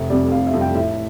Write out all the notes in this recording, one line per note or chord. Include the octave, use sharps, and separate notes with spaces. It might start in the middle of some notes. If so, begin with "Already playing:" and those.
Already playing: F1 E5
F2 C3 G3 D5
F1 F5
E5
F2 C3 G3
G5
A2 E5